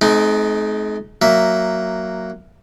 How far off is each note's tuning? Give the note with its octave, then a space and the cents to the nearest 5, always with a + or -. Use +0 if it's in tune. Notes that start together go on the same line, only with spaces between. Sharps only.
G#3 +45 C4 -15 D#4 +0
F#3 +0 A#3 -5 E5 +0